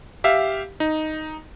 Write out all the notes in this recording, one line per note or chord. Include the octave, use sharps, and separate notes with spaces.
G4 E5 F5
D#4